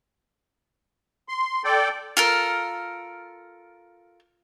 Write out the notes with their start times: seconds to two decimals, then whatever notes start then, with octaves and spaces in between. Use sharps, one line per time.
1.29 C6
1.64 A4 D5 G5
2.17 F4 A4 A#4